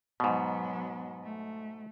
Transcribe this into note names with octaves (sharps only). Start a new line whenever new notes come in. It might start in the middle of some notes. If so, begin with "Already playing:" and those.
G#2 B2 F#3 B3
A3